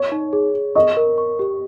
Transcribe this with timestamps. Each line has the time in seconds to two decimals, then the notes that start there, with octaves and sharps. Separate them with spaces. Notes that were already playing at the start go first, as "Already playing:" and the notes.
Already playing: C#5
0.12 D#4
0.33 G#4
0.55 G#4
0.75 D#5 C#6
0.97 A#4
1.18 C#6
1.39 G4